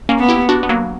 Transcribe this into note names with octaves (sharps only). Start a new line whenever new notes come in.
A#3 C#4
B3
E4 G4
D4 F#4
B3
F#3 A#3